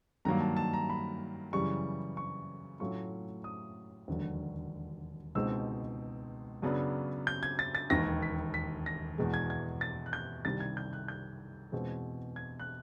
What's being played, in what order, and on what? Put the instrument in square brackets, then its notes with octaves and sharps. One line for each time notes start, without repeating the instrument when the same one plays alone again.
[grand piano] G2 D#3 F#3 A#3 A#5
A5
A5
A#5
B5
F#2 C#3 E3 G3 C#6
C#6
A2 F#3 A3 C#4 F4 C#6
D#6
E1 D#2 D3 F#3
C#2 B2 G#3 C4 D#4 E6
F#2 C#3 F#3 B3 D4
G6
G#6
A6
A6
E1 D#2 D#3 A#6
B6
B6
A#6
E2 B2 G#3
G#6
G#6
A6
F#6
G6
C2 C3 D#3 G3 A6
G#6
G6
F#6
G6
E2 B2 G#3 C4 F4
G#6
F#6